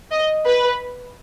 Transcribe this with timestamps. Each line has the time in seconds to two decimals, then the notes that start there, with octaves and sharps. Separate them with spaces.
0.11 D#5
0.46 B4